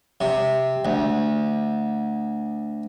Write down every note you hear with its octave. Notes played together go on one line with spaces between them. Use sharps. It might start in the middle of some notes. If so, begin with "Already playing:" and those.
C3
D2